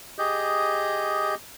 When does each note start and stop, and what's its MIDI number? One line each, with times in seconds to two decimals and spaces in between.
0.19 1.35 67
0.19 1.35 68
0.19 1.35 75
0.19 1.35 91